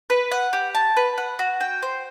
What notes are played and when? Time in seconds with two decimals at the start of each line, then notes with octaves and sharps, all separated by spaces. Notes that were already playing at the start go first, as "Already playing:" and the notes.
0.10 B4
0.31 F#5
0.53 G4
0.75 A5
0.97 B4
1.18 F#5
1.39 F#4
1.61 G5
1.82 C5